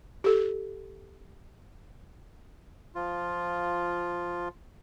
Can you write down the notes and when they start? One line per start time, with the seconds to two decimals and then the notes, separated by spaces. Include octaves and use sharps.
0.24 G4 A4
2.95 F3 F4